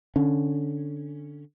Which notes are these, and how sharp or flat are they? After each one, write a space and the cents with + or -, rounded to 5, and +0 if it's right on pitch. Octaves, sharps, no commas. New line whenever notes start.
D3 +0 C#4 +0